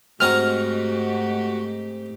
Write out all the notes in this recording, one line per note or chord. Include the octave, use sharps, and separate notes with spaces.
G#2 G#3 A3 C4 F#4 G4 A#5 F6